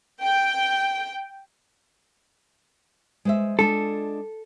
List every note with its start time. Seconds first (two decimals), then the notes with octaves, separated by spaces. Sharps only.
0.22 G5
3.25 G#3 C5 E5
3.59 G#3 D4 F4 A4